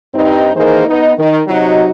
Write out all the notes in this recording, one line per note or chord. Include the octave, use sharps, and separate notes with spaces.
G2 C4 D#4
D#3 E3 A#3 D#4 G#4 C5
B3 D#4
D#3
C3 F#3 D#4 F#4 D#5